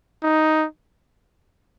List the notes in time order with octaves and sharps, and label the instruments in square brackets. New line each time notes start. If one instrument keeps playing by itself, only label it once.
[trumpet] D#4